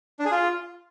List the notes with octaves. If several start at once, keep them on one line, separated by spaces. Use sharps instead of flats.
D4
G#4
F4